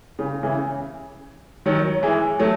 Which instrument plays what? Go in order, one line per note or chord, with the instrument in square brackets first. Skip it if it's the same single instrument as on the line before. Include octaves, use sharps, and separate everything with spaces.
[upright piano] C#3
C#3 E3
D#3 F#3
E3 G#3
F#3 A3